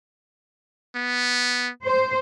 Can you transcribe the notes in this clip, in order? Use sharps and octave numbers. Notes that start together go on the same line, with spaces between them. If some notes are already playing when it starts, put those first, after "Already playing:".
B3
C5